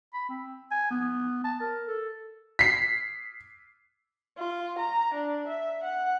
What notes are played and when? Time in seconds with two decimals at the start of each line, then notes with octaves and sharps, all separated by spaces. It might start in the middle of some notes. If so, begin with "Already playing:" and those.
0.14 B5
0.29 C4
0.71 G#5
0.90 B3
1.44 A5
1.61 A#4
1.87 A4
2.59 B6 C7
4.38 F4
4.79 A#5
5.14 D4
5.48 E5
5.84 F#5